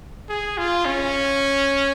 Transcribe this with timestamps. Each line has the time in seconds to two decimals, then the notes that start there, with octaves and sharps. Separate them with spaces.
0.29 G#4
0.58 F4
0.85 C#4